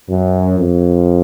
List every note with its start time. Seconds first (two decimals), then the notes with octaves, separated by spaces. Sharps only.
0.09 F#2
0.59 F2